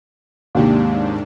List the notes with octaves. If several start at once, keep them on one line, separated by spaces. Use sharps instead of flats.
D#2 G#2 C3 D4 G4